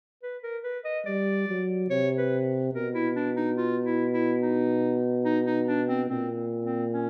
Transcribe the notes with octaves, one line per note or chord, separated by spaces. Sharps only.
B4
A#4
B4
D#5
G3 D5
F#3
C3 C#5
B4
B2 A#4
E4
D4
D#4
F4
E4
E4
D#4
D#4
D#4
D4
C4
A#2 C4
C4
C#4